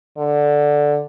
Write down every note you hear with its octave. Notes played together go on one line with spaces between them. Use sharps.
D3